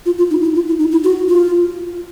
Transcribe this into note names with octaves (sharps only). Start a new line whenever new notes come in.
F4
F4
D#4
E4
F4
E4
D#4
E4
F#4
F4